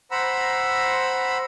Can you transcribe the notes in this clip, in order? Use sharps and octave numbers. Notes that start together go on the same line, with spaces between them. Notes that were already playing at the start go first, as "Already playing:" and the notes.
C5 F#5 A#5 B5 E6